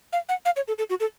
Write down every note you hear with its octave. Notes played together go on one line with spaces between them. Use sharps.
F5
F#5
F5
C#5
A4
A4
F#4
A4